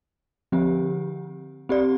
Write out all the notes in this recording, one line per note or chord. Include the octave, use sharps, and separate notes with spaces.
D3 F3 C4 G4
C4 G4 D5